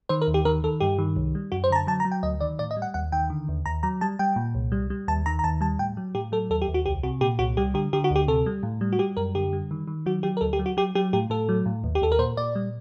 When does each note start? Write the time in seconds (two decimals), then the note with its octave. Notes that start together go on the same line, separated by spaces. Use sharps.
0.09 D#3 C5
0.22 A#4
0.27 D#2
0.34 G4
0.45 D#3 A#4
0.64 D#3 A4
0.80 G2 G4
0.98 D#3
1.16 C2
1.35 G3
1.52 F#2 F#4
1.64 C5
1.70 D3 A#5
1.75 A5
1.87 F#3 A5
2.00 A#5
2.05 F#3
2.12 G5
2.23 D2 D#5
2.41 D#3 D5
2.59 A2 D5
2.71 D#5
2.77 G3
2.82 F#5
2.94 D#2 F#5
3.12 D#3 G5
3.30 D3
3.48 D#2
3.66 D#2 A#5
3.83 F#3 A#5
4.01 G3 A5
4.19 G3 G5
4.36 A#2
4.55 C2
4.72 G3
4.90 G3
5.08 D#2 A5
5.26 D#3 A#5
5.39 A#5
5.44 D#2 A5
5.61 G3 A5
5.79 A2 G5
5.97 F#3
6.15 A2 G4
6.32 F#3 A4
6.50 D#2 A4
6.62 G4
6.68 D#2
6.74 F#4
6.86 C2 G4
7.03 C3 F#4
7.21 A#2 G4
7.39 C2 F#4
7.57 G3 G4
7.74 D3 G4
7.93 D3 G4
8.04 F#4
8.11 D2
8.16 G4
8.28 C3 A4
8.46 G3
8.63 A2
8.81 G3
8.93 F#4
8.99 G3 G4
9.17 F#2 A#4
9.35 D3 G4
9.53 G3
9.71 D#3
9.88 D#3
10.06 F#3 F#4
10.23 F#3 G4
10.37 A#4
10.41 D2 A4
10.53 G4
10.59 F#3
10.66 F#4
10.77 F#3 G4
10.95 F#3 G4
11.13 A2 G4
11.30 A2 A4
11.49 F#3
11.66 A2
11.84 D#2
11.95 G4
12.02 D#2 A4
12.12 A#4
12.19 A#2 C5
12.37 A#2 D5
12.55 G3